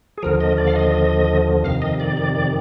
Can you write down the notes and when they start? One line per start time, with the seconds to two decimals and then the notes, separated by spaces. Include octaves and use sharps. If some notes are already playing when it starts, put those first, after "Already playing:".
0.18 G#4
0.23 D#2 D3 F3 A#4
0.40 D#5
0.58 D5
0.67 F5
0.76 D#5
1.64 F2 C3 D#3 F5
1.82 D#5
2.00 D5
2.17 D5
2.35 D5